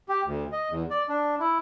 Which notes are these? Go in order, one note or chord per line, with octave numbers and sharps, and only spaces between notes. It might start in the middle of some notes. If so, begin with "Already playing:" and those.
G4
D2
D#5
E2
D5
D4
E4